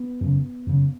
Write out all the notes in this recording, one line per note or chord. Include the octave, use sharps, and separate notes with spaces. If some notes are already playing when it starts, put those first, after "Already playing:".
Already playing: B3
F#2 C#3
F#2 C#3